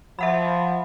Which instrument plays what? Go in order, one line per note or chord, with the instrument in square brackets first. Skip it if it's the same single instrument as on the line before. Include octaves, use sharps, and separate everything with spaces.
[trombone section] F3 [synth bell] E5 F#5 B5